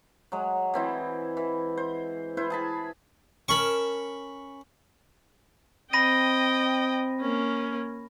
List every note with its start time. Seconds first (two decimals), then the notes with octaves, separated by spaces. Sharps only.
0.32 F#3 G#3
0.74 E3 C4 E4
1.37 E3
1.77 C5
2.37 E4 B4 C5
2.50 G#4 A5 B5
3.48 C#4 A#4 A5 B5 C#6
5.93 C4 D#5 G5 B5 A#6 D#7
7.21 A#3 C#4